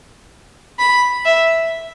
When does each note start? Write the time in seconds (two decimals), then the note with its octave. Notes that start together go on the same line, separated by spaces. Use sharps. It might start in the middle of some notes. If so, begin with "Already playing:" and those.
0.79 B5
1.25 E5